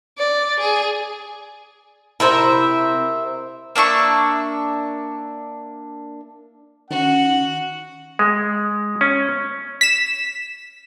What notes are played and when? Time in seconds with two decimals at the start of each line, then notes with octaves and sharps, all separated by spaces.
0.19 D5
0.60 G#4
2.20 C3 E4 A#4 C5 E5
3.76 A#3 D4 E5 C#6
6.90 D#3 C#4 F#4 F#5
8.19 G#3
9.01 C#4
9.81 B6 E7